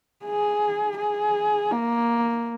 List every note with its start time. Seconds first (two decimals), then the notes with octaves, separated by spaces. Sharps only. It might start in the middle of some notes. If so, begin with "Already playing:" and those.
0.25 G#4
0.98 G#4
1.71 A#3